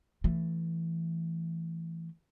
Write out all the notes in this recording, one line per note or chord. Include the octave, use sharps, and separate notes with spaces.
E3 A3